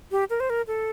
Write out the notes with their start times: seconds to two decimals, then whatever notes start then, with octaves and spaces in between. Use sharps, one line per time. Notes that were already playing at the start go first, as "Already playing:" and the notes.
0.11 G4
0.30 A#4
0.40 C5
0.50 A#4
0.67 A4